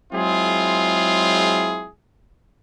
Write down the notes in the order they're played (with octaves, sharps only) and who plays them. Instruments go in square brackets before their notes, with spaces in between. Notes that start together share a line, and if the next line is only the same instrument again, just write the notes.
[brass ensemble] F#3 G#3 C4 E4 F4 G#4